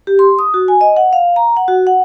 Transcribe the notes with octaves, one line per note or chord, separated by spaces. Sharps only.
G4
C6
D#6
F#4
G#5
D#5
F#5
F5
A#5
F#5
F#4
F#5